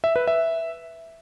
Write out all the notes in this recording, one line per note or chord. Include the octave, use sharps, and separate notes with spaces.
E5
B4
E5